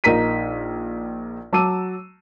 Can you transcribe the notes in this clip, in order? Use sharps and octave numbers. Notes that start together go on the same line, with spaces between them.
A#1 D#4 A#4 A#5 B6 D#7
F#3 A5 D6 E6 D#7